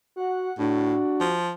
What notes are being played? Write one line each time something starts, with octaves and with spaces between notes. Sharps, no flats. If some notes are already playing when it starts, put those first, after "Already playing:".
F#4 F#5
A2 D4 F#4
F3